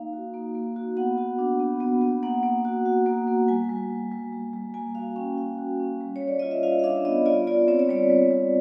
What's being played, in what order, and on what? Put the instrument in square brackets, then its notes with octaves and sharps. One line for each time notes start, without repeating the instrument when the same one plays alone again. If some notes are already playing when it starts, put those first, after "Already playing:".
Already playing: [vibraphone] A#3 D#4 F5
F#4
A#3
A#3
F#4
B3 F#5
F#4
D4
B3
B3
B3
A#3 F#5
A#3
F#4
F#4
A#3
A#3
G3 G#5
G3
G3
G3
G3
G3
A#3 G#5
F#4 F5
C#4 G5
C#4 F5
F#4
C#4
G3
C#5
G3
D5
F4 D#5
E5
F4 F5
F5
D4 E5
B3 D#5
F4 D5
F4 D5
C4 C#5
D5
G3 C#5
G3
G3